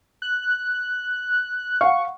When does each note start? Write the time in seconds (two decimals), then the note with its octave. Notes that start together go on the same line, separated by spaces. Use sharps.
0.22 F#6
1.81 F5 F#5 C#6